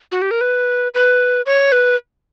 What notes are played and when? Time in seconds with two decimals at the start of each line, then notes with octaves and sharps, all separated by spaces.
0.12 F#4
0.22 G4
0.31 A#4
0.41 B4
0.94 B4
1.46 C#5
1.72 B4